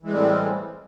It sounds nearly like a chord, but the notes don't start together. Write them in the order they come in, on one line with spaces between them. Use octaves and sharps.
E3 G#3 A2 G3 C4